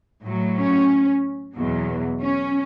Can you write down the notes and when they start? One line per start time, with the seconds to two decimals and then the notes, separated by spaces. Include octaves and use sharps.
0.24 A2 F#3
0.57 C#4
1.55 E2 B2 F#3
2.22 C#4